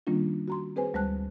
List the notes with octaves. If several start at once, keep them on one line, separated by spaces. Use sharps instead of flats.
D#3 G3 A#3 C#4 D4 F4
F#4 A#5 C6
C4 G#4 B4 C5 G#5
D2 G3 G#3 C5 A5 F#6